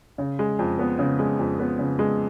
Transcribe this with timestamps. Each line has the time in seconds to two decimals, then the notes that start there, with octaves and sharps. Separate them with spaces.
0.18 C#3
0.39 G#3
0.59 F2
0.79 B3
0.99 C#3
1.19 G#3
1.39 F2
1.59 B3
1.79 C#3
1.99 G#3